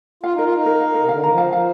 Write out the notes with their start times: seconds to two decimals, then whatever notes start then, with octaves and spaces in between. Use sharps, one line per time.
0.23 F4 F5
0.35 D#4 A#4
0.44 F4
0.52 D#4 F5
0.66 A#4
0.81 F5
0.95 A#4
1.00 C3
1.09 D3 F5
1.20 D#3 A#5
1.31 F3
1.38 F5
1.52 F3 F5